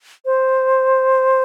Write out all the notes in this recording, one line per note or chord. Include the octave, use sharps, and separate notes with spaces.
C5